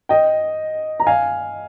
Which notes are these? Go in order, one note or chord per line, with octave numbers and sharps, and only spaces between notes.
D#5 G5
A#5
F5 G#5